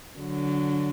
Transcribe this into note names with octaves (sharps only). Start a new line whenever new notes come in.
D3 F#3